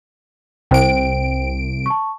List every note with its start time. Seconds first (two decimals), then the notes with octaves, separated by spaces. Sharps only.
0.71 C2 C5 G5 D7
1.86 A5 C#6